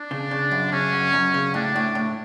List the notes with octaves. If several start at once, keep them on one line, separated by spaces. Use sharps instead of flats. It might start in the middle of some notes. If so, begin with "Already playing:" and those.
Already playing: D4
C#3
C#3
F#2
C#3 C#4
F#2
F#2
C#3
A2 D4
A2
A2